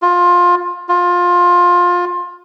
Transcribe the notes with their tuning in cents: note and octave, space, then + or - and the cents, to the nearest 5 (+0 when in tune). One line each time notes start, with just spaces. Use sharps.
F4 +20
F4 +20